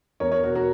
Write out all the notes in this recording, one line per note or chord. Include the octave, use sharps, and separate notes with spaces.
E2 A#4 C#5
A#4 C#5
B2 F#4 A#4
F#4 A#4